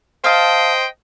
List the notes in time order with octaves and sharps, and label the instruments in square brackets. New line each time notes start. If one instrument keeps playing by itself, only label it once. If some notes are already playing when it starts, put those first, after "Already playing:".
[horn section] C5 D#5 G5 [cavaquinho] F5 A5